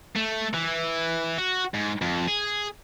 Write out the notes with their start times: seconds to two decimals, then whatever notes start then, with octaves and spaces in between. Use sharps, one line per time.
0.16 A3
0.54 E3
1.39 F#4
1.74 G#2
2.02 F2
2.27 G#4